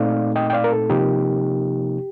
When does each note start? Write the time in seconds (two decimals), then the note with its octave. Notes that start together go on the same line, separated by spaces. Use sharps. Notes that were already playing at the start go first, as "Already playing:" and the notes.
Already playing: A#2 A3 C4 D#4 D5 F5
0.36 D#5 G5
0.50 G5
0.53 D5 F5
0.64 A#4
0.72 A4
0.89 C3 F3 A#3 D#4 G4